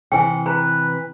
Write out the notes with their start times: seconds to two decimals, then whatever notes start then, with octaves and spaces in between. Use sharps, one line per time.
0.12 C3 E3 G5 G#5
0.46 B4 A#5